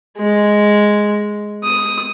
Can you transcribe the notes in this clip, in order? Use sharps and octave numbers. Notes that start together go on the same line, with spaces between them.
G#3
D#6